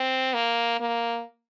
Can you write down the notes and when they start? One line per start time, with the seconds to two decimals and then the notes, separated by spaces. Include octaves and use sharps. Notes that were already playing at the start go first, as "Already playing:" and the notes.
Already playing: C4
0.34 A#3
0.80 A#3